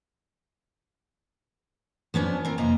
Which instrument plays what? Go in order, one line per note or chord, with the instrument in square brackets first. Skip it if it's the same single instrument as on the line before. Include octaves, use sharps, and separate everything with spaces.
[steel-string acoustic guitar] F3 B3 C#4 D4
C4 A#4
F2 C3 A#3 D#5 A#5